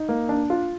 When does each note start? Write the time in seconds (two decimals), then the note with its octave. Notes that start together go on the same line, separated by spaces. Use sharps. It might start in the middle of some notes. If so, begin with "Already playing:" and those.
Already playing: D#4
0.09 A#3
0.29 D4
0.50 F4